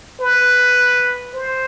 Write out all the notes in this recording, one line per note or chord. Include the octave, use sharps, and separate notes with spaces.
B4
C5